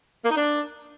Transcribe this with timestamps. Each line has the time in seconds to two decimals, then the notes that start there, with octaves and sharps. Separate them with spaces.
0.24 A#3
0.30 D#4
0.37 D4